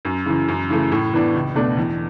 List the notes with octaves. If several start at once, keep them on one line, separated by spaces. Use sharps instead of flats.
F#2
C#3 E3
F#2
C#3 E3 A3
A2
E3 B3 D4
C#2
B2 A3 D4
E2